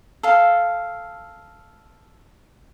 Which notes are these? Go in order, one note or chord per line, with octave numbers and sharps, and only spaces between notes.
A4 F5